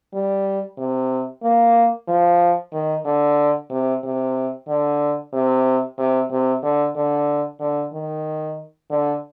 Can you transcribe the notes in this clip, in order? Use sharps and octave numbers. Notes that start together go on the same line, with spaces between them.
G3
C3
A#3
F3
D#3
D3
C3
C3
D3
C3
C3
C3
D3
D3
D3
D#3
D3